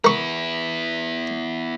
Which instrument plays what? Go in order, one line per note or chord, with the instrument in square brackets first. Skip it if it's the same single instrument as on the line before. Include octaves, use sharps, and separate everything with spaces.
[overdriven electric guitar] B3 E4 [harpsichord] A#4 C#6